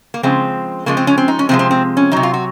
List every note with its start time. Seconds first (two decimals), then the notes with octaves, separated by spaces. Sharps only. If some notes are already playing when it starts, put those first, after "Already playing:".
0.14 A#3
0.23 C#3 F3 G#3 C4
0.86 C#3 F3 G#3 A#3
0.97 C4
1.07 C#4
1.18 C4
1.28 D#4
1.39 C#4
1.49 C3 F3 G#3 C4
1.59 C4
1.71 C4
1.97 C#4
2.12 C3 F#3 D#4
2.23 F4
2.34 F#4